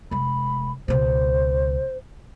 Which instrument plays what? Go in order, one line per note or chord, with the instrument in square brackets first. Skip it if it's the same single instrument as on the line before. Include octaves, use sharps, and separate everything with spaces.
[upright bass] F1 G#3 [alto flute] B5
[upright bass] C#2 B2 [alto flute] C5